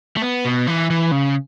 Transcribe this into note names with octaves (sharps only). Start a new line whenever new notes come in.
A3
B3
B2
E3
E3
C#3